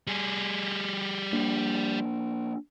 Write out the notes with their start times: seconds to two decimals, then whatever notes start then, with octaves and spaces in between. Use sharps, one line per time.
0.07 G3 G#4
1.33 A#3 D4